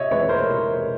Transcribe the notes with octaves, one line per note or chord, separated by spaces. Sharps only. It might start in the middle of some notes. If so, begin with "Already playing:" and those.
Already playing: C3 C#5 D#5 E5
E3 G#3 C4 B4 C#5
A#4 C5
C3